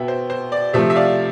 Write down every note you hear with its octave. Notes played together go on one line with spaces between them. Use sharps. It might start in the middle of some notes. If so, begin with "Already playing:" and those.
Already playing: B2 B3 E5 G5
C5
C5
D5
C3 F3 A3 C5 E5
E5
D5 F5